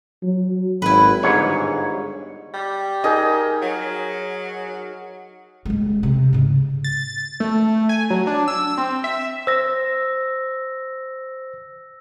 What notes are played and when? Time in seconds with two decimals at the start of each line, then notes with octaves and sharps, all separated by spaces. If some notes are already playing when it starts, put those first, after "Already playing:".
0.23 F#3
0.82 G#1 E4 B4
1.23 G1 G#2 C#5
2.54 G3
3.04 D#4 G#4 A#4 D#5
3.62 F#3
5.65 D#1 G#3
6.03 C3
6.33 G#2 C#3
6.84 A6
7.40 A3
7.89 G#5
8.10 F#3
8.27 D4
8.48 E6
8.78 C4
9.04 E5
9.47 C5 E6 A#6